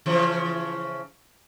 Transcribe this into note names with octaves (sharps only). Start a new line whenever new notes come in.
C#3 E3 F3